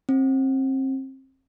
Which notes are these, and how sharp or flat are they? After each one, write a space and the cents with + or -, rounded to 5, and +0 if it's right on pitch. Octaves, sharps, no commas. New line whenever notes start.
C4 +30